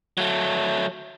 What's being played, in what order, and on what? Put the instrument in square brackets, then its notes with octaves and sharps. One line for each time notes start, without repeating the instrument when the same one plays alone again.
[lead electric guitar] F#3 A3